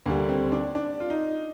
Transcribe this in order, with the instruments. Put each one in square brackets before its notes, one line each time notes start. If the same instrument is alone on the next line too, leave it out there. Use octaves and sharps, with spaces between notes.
[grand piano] D2 D3 G3 A#3
C4
D4
D4
F4
D#4